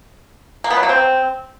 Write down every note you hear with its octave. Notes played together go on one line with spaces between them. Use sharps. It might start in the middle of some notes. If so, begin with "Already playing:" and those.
A#3
B3
F#3
A#3
C4